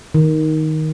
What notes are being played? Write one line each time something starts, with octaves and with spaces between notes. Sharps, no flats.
D#3